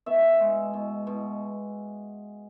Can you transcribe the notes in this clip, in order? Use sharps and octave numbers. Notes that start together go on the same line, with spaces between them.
B2 E5
G#3
B2
B2